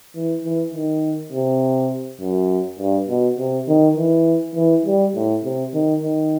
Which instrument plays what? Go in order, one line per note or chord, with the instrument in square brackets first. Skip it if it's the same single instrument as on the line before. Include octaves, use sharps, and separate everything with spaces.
[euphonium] E3
E3
D#3
C3
F#2
G2
B2
C3
D#3
E3
E3
G3
A2
C3
D#3
D#3